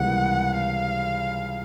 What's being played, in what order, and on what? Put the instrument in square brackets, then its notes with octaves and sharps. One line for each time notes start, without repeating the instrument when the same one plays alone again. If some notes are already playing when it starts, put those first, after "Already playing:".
Already playing: [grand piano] C#2 C3 E3 G3 A#3 [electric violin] F#5
[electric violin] F5